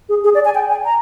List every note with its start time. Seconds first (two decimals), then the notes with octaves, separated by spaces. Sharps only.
0.09 G#4
0.24 G#4
0.34 D5
0.45 G#5
0.55 G5
0.70 G#5
0.85 A#5